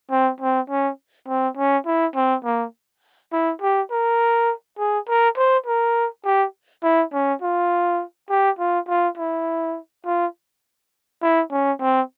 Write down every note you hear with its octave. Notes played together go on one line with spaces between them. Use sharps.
C4
C4
C#4
C4
C#4
E4
C4
A#3
E4
G4
A#4
G#4
A#4
C5
A#4
G4
E4
C#4
F4
G4
F4
F4
E4
F4
E4
C#4
C4